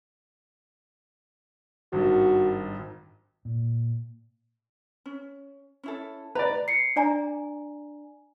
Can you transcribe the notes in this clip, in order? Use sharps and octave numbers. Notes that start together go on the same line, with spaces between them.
G#1 G2 D#3 F#4
A#2
C#4
C#4 E4 A4
B4 D5 A#5
C7 C#7
D4 D5 G#5 A#5